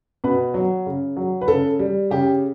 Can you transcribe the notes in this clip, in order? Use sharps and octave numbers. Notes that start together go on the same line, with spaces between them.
B2 B4
F#3
C#3
F#3
B4
C#3 A4
G3
C#3 G4